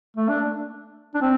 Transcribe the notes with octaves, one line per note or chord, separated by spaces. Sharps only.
A3
D4
D4
C4